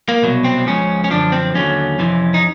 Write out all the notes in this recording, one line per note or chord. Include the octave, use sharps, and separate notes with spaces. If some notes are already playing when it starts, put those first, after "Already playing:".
A#3
C2 B2 F#3
C4
C#2 C#3 F3 C#4
C#4
F#2 D3 F3 D4
C4
D#2 D3 F#3 C#4
F2 C3 E3
D#4